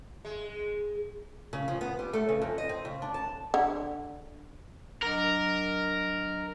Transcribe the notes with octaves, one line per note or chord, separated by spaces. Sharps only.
G#3
C#3
F3
B3
G3
A3
C#3
F2
D#5
C4
C#3
D4
A5
D3
F#3 D4 A#4 D#5